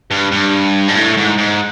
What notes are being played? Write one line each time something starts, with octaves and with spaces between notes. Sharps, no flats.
G2
G2
G#2
A2
G#2
G#2